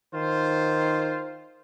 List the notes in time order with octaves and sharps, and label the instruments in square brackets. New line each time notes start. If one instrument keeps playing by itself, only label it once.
[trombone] D#3 [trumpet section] F4 C5